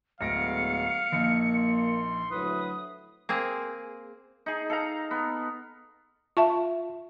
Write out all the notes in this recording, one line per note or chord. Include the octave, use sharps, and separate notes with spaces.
D1 A2 G#3 B3 F5 A#6 C#7 D7
A#1 A#3 D#4
C6
D2 F#3 E4 B4 D#6
A#3 C4 G#4
D#4 G#4
A4 F5 A#5
B3
F4 E5 A5 C#6